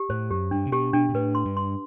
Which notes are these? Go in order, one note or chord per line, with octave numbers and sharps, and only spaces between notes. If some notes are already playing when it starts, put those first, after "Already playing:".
Already playing: G4
A2 C5
F#2 G4
G2 D4
C3
B2 G4
B2 D4
B2
A2 B4
C6
G2
C6